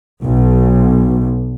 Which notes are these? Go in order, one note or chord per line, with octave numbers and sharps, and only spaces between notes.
B1